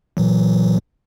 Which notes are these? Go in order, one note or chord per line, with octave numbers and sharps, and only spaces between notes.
A#2 E3 F#3